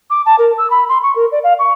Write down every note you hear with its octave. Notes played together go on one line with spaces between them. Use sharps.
D6
A5
A#4
E6
B5
C6
C#6
A#4
D5
F5
C#6